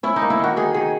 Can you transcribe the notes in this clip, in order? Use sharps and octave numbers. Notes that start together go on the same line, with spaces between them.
C#4 E4
D#4
A#3
E4
D#3 F#4
D#3 G#4
D#3 G#4